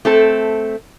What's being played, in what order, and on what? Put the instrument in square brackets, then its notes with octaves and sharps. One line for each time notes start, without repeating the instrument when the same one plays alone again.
[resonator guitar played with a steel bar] A3 C4 A4